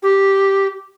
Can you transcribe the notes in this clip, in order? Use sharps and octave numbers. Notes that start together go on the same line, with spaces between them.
G4